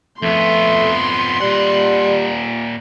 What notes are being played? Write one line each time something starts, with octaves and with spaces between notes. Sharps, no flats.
F2 A3 B3 C6
A#2 G3 F#5